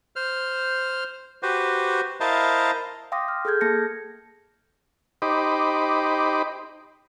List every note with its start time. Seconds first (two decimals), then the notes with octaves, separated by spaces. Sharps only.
0.16 C5 F6
1.43 F#4 G4 B4 C5
2.21 E4 A#4 C5 D#5 F5 A5
3.12 F5 G5 C6 D6 D#6 A#6
3.28 F6
3.45 G#4 A4 F6 G6 G#6
3.61 A#3 A5 A#6 C#7
5.22 D#4 G4 C5 D#5 B5 D6